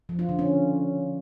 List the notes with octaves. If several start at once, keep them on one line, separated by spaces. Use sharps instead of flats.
F3
F4
D3
C#4